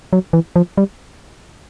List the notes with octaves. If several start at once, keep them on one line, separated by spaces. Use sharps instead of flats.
F#3
E3
F3
G3